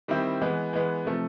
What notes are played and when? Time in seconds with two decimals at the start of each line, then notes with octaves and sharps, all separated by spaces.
0.08 D#3 G3 C4 E4
0.42 E3 G#3 B3
0.73 E3 G#3 B3
1.05 C3 F3 A3